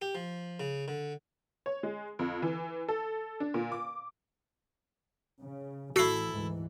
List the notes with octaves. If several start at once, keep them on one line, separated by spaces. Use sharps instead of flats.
G4
F3
C#3
D3
C#5
G#3
F2
E3
A4
D4
A#2
D6
C#3
A1 E3 E4 F#4 A4 C7
D2 G#2 E3